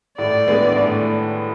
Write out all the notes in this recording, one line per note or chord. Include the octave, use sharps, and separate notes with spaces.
A2 D5
E3 G#3 B3 D4
A2